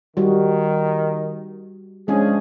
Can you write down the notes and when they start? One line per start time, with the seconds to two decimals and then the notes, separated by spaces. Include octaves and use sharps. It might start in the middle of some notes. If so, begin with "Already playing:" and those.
0.17 D#3 G3 F#4
2.08 F3 G#3 C#4 D4 G#4